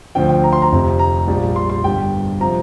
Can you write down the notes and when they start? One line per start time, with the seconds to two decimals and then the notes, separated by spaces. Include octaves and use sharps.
0.15 D2 D3 F3 G5
0.29 G5
0.44 A#5
0.53 C6
0.62 A#5
0.72 F1 F2 C3
0.99 A#5
1.27 A#1 A#2 G3
1.56 C6
1.70 C6
1.84 G1 G2 G3 G5
2.40 C3 F3 A#5